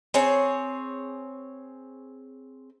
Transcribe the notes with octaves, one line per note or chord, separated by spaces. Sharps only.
C4 G#4 C#5